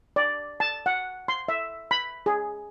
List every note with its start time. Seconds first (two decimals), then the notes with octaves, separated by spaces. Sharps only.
0.16 D5
0.60 A5
0.86 F#5
1.28 C6
1.48 E5
1.91 B5
2.26 G#4